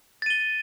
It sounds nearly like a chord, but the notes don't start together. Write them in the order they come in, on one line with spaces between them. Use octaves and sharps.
A6 D#7 G7